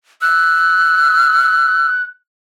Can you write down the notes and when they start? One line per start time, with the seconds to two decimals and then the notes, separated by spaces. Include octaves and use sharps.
0.22 E6 F#6